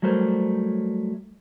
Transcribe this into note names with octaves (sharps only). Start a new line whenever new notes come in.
F#3 G3 A3 A#4 C5 C#5